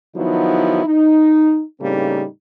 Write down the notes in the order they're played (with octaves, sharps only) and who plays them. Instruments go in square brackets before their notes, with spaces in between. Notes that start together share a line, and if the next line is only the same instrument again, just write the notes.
[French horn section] D#3 F3 F#3 B3 D#4 E4
D#4
A2 C#3 G3 A#3 C4 D#4